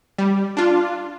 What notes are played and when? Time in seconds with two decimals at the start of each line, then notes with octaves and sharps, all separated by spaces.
0.18 G3
0.57 D4 F4